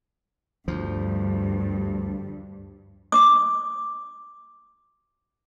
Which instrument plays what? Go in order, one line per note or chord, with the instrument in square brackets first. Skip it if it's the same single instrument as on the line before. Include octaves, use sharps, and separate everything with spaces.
[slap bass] D2 F3 [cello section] G2
[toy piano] D6 D#6